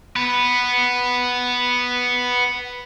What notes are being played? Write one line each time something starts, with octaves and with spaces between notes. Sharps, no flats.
B3 B4